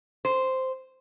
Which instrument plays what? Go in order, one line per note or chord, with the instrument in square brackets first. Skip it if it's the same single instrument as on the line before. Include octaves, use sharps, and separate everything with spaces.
[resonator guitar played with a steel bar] C5